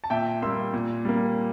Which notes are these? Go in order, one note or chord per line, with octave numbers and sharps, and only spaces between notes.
A5
A#2 E5 G5
G3 A#3 C6 E6
A#2
G3 A#3